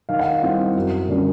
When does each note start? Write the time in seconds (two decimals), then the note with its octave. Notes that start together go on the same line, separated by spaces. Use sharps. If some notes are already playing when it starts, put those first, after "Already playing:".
0.09 D#3 F5
0.19 F#5
0.29 F5
0.42 G3 C4 E4
0.75 F#2
1.08 D3 G3 A#3 C#4